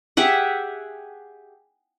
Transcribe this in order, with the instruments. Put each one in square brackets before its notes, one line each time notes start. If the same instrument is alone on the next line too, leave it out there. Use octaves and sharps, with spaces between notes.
[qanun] G4 G#4 E5 F#5